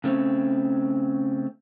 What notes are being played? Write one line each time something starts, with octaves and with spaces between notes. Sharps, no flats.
C#3 A3 C4 C#4